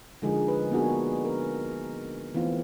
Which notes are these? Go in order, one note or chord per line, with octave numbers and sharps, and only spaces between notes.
D3 F3 G#3 D#4 G#4 A#4
B4
A#3 B3 D4 D#4 F#4 G#4
A#4
E3 A3 B3 C4 F4